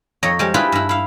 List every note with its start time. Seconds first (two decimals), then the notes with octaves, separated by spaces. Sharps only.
0.23 F2 C#5 D#5 A#5
0.39 G3 G#3 C4
0.54 D4 E4 F4 G4 G#4 B4
0.72 G2 E4
0.89 E4 F5